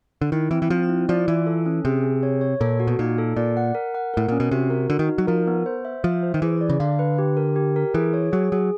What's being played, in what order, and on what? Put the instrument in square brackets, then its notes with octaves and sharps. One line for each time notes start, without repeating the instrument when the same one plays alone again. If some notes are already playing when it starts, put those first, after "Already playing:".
[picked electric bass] D3
[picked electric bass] D#3 [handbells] E4
[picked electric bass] E3 [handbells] C4
[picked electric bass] E3
[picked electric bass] F3 [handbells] C4
[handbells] E4
[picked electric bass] F3 [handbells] D5
[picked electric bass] E3 [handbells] F4
[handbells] A4
C#4
[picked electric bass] C3 [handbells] G#4
[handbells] G#4
C#5
C#5
[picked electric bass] A#2 [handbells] A4
[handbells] F#4
[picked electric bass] B2
[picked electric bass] A#2 [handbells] D#4
[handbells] A4
[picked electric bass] A#2 [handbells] D5
[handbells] F#5
A#4
F#5
[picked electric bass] A2 [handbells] A#4
[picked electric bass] A#2 [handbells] C#4
[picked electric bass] B2
[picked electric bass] C3 [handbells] F#4
[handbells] A#4
[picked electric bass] D3 [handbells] F#4
[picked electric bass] D#3
[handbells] D#4
[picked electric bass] F#3
[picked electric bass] F3 [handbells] A#4
[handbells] B3
C5
E5
[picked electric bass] F3 [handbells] E5
[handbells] C5
[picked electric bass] D#3
[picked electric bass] E3 [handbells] G#4
[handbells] D5
[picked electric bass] C#3
[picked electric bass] D3 [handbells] F5
[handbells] B4
G4
A#4
G4
A#4
[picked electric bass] E3 [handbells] G#4
[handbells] C#5
[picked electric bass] F#3 [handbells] G#4
[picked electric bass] F#3 [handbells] G#4